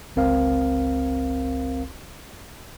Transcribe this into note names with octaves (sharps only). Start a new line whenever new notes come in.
G1 C#2 C4 A#4 F5